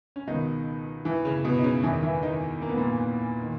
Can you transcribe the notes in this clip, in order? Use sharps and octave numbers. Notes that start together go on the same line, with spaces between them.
C#4
C#2 B2 D#3 D#4
E3 E4
C#3 C#4
B2 B3
D#4
C#3 C#4
E2 D#3 E3 E4
E3 E4
D#3 D#4
A#3
B3
A#2 A#3
D#3